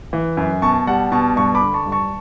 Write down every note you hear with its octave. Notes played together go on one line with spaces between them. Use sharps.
E3
F#2
B2 A5 C#6
G3 F#5 A5
B2 A5 C#6
G2 A5 C#6
B5 D6
D3
A5 C#6
G2
A5 C#6